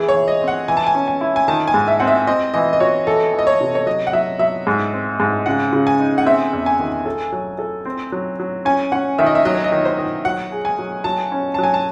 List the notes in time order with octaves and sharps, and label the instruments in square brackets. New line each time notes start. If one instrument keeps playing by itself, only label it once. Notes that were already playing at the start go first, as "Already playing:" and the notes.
Already playing: [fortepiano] E3 [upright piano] G#4
[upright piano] C#5
[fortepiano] E3
[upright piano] D#5
[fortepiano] C4
[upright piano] F#5
[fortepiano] E3 [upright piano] G#5
[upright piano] A5
G#5
[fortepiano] C#4
[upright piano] G#5
[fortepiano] E4
[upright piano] G#5
[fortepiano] D#3 [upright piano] A5
[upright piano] G#5
[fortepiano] G#2
[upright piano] E5
[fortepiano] C4 [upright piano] F#5
[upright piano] E5
[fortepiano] C4 [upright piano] D#5
[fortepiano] E3 [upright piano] D#5
[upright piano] D#5
[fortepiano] F#4 [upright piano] C#5
[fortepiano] E3 [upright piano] A4
[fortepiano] E3
[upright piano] D#5
C#5
[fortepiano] C3
[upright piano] C#5
[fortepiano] F#3 [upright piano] D#5
[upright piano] F#5
[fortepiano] F#3 [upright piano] E5
[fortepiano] F#3 [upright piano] E5
[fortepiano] G#2
C4
G#2
[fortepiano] C#3 [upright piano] F#5
[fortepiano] C#3
[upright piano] G#5
[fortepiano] D#4
[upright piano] F#5
[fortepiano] C4 [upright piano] E5
[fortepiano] E2
[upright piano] G#5
[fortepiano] D#3
A4
F#3
A4
C4
F#3
F#3
[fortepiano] C#4 [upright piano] G#5
[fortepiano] C#4 [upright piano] F#5
[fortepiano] D#3 [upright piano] E5
[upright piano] D#5
E5
[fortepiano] F#3 [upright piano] D#5
[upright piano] C#5
D#5
[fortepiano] D#3
[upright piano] C5
[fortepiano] D#3
[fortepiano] F#3 [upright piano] F#5
[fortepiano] G#4
[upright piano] G#5
[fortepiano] F#3
[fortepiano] F#3 [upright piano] A5
[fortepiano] C#4
[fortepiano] F#3 [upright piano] A5
[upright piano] G#5
A5